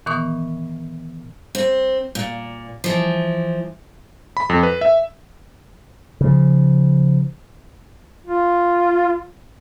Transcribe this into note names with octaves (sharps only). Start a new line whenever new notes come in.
A#2 D#3 E3 B3 C#6 D#6
C4
A#2
E3 F3
B5
F2
B4
E5
C#3 F3
F4